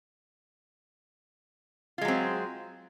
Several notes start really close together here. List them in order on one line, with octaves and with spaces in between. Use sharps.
F4 G#3 F#3 C4